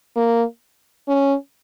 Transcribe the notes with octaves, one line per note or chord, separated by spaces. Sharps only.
A#3
C#4